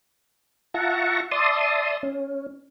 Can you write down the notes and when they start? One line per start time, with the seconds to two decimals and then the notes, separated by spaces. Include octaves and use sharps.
0.74 F4 E5 F#5 A5 A#5 C#6
1.31 D5 E5 A5 C6 D#6
2.03 C#4